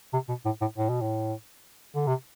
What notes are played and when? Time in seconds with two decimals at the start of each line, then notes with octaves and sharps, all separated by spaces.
0.13 C3
0.29 B2
0.46 A2
0.61 A2
0.77 A2
0.89 B2
1.01 A2
1.95 D3
2.07 C3